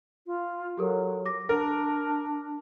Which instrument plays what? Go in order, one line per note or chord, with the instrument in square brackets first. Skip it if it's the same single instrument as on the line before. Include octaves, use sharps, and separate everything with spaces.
[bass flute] F4
[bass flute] F#3 [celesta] G4 A4 A#4
[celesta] D6 A#6
[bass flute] D4 [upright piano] A#4